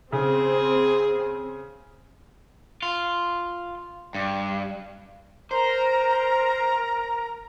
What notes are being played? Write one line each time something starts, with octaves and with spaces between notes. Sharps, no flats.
C#3 C4 G#4
F4
G2
A#4 C5 A#5